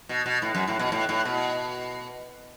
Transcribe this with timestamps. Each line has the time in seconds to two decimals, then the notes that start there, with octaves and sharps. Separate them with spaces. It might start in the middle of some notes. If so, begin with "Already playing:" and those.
0.09 B2
0.26 B2
0.42 A2
0.55 F#2
0.68 A2
0.79 B2
0.92 A2
1.09 A2
1.25 B2